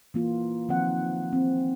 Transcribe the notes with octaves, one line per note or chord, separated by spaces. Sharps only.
E3 A#3 F4
D#3 F3 C4 F#5
C4